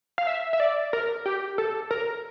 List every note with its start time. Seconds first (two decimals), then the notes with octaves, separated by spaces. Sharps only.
0.18 F5
0.27 E5
0.53 E5
0.60 D5
0.93 A#4
1.26 G4
1.58 A4
1.91 A#4